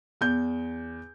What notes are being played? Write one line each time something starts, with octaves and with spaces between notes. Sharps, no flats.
E2 G6